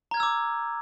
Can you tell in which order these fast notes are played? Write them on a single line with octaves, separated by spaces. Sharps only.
A#5 G#6 F6 E6 D6